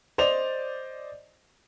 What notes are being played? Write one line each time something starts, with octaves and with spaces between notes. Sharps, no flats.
C5 D5 D#5 F7